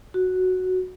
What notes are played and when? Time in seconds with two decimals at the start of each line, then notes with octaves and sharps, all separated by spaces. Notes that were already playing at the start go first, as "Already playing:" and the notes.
0.14 F#4